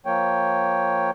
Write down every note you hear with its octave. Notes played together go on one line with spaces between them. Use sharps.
F3 A#3 C#5 G5